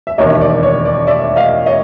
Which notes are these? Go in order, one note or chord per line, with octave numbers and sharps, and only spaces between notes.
E5
E1 D#2 D#3 C#5 D#5
D5
C#5
D5
D5 E5
D#5 F5
C#5 D#5